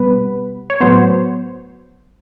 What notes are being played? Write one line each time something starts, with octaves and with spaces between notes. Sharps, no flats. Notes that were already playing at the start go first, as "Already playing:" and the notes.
Already playing: B2 G3 B3 B4
C#5
A2 F#3 B3 C5